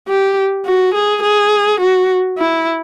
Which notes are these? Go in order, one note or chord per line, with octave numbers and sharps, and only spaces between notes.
G4
F#4
G#4
G#4
F#4
E4